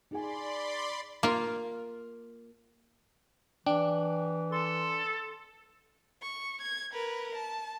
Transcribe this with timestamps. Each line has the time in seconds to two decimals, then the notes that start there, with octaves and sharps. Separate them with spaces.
0.11 D#4 G#4 D5 G#5 B5 C6
1.23 A#3 F4
3.66 E3 D4 G5
4.52 A4 C6
6.22 C#6
6.62 G#6
6.93 A#4 B4
7.35 A5